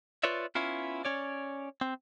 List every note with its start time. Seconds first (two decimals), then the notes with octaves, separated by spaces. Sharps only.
0.23 F4 B4 C#5 D5 E5
0.55 B3 C#4 E4 F4
1.05 C#4 C#5 D5
1.81 C4